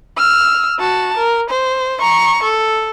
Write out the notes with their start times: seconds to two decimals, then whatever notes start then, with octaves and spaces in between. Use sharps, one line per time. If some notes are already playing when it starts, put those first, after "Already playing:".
0.18 E6 F6
0.79 F#4 A5
1.17 A#4
1.50 C5
2.01 A#5 C#6
2.43 A4